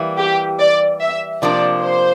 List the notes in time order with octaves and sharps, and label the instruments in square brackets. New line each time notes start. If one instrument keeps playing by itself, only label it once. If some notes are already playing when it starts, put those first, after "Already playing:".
Already playing: [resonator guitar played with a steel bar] E3 G3 A#3
[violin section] G4
D5
E5
[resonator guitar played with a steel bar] C3 F3 A#3 D4 [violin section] D5
[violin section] C5